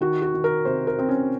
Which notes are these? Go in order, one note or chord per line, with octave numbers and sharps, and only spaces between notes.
D#3 F#4
F#4
D#3
A#4
C3 C5
A#4
C3 C4
C#4